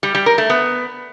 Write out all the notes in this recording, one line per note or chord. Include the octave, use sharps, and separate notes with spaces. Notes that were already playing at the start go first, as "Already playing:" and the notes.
G3
G3
A#4
A3
B3